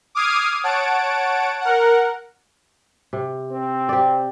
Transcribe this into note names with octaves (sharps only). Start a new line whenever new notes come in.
D6 D#6 F6 G#6 C7 D#7
C#5 F#5 A5 D7
A#4 F#5
C3
C4
G4 D5